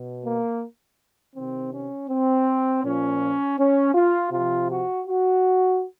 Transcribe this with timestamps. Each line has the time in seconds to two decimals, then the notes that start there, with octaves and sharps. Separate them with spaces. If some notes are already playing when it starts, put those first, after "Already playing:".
Already playing: B2
0.23 A#3
1.34 C3 D#3 C4
1.72 C#4
2.09 C4
2.83 A#2 F3 C#4
3.57 C#4
3.94 F4
4.31 C3 F3 F4
4.68 F#4
5.06 F#4